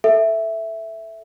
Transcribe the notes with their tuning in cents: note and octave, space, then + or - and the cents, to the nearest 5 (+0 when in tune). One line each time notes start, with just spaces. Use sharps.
A4 +0 E5 +0